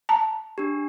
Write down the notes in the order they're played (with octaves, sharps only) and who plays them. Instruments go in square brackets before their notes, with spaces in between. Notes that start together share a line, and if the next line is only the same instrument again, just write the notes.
[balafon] A5 A#5
[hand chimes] D4 G4